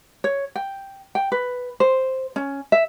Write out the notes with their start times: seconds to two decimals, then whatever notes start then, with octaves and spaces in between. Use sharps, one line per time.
0.24 C#5
0.56 G5
1.15 G5
1.32 B4
1.80 C5
2.36 C#4
2.72 E5